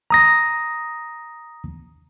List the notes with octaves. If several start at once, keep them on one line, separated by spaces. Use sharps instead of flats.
A#5 D#6 A#6